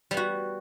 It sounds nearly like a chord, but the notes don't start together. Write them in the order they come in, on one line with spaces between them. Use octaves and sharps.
G3 B3 F#4